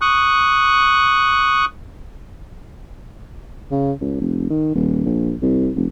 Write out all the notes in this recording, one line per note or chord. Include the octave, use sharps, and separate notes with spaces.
C#6 D#6 F#6
C#3
C#2
F1
D#3
D#1
A#1
C2
F1